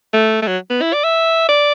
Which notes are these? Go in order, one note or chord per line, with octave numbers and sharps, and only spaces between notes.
A3
A3
F#3
B3
E4
D5
E5
D5